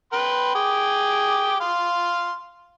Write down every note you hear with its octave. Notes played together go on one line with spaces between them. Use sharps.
B4 G5 C6
G#4 G5 D6
F5 C6